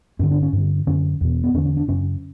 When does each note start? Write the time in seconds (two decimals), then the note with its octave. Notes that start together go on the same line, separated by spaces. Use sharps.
0.19 G2 D3 C#4
0.31 D4
0.43 C#4
0.53 G2 D3
0.87 F#2 D3 C#4
1.21 E2 B2
1.44 B3
1.54 E2 D3 C#4
1.66 C#4
1.77 D4
1.88 F#2 C#3 C#4